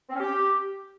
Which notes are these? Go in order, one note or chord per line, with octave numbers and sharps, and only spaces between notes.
C4
C#4
G4